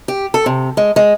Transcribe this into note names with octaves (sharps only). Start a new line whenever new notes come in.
G4
A4
C3
G#3
G#3